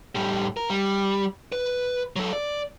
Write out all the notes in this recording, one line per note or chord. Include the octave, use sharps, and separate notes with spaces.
A2 G3
A#4
G3
B4
F#3 A4
D5